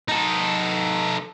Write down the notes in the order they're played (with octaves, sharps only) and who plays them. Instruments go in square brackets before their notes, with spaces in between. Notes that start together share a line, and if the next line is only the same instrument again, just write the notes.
[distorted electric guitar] D#4 A4